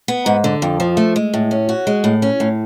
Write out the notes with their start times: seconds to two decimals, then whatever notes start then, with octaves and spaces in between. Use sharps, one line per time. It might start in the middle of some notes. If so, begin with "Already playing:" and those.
0.08 B3
0.26 G#2
0.44 D3
0.62 F2
0.80 F3
0.97 A3
1.16 G#3
1.34 A2
1.51 C#4
1.69 F#4
1.87 G#3
2.04 A2
2.22 C#4
2.40 A2